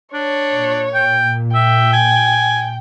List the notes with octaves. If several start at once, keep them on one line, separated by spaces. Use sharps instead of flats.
D4 C#5
A#2
G5
E5 G5
G#5